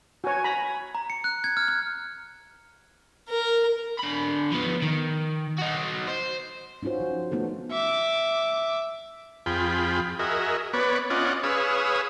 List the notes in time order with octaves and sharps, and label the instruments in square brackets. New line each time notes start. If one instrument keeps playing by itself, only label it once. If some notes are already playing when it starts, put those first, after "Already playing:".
[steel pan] F#4 C#5 [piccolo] G#5
[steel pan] A#5 B5
[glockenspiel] A#5
C#7
F#6
G#6
F6
F6
[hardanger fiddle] A#4
[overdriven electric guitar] D3 B5
F3 B3
D#3
D#4 F#4
C5
[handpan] C#4 D#4 F4 F#4 C5
F3
A3 B3 D#4 F#4 A4
[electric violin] E5 D6
[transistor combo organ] F2 F4 G#4 G5 B5
F#4 G#4 A#4 D#5 E5
B3 B4 C#5 D5
C#4 F4 D5 D#5 F#5
G#4 B4 C#5 F5 D#6 E6